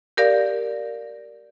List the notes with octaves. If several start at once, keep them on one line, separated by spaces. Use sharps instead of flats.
G4 A#4 D5 F5